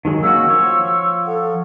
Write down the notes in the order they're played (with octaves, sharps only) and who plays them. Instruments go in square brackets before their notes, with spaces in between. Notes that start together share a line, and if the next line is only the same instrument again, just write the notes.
[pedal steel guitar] D#3 F#3 G#3
[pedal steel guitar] A#3 C#4 F#4 [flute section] E6
[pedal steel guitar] F3 C#5
[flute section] A4 F#5